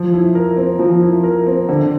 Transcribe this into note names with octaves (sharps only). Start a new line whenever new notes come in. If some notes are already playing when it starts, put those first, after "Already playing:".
Already playing: F3
E4
A#4
C4
F3
E4
A#4
C4
D3